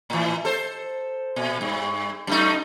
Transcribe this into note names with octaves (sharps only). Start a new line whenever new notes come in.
A2 E3
A4 C5
A#2
G2
F#2 A3 D#4